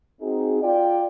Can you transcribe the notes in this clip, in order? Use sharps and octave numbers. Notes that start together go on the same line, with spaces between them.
C4 D#4 F#4 G#4
F4 D5 G5